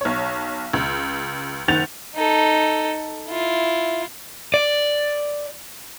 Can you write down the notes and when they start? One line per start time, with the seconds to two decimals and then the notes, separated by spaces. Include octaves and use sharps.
0.01 B1 C#5
0.73 C#2
1.68 F#1 D#3 F#5 G6 A6 F7
2.15 D#4 A4
3.29 E4 F4
4.54 D5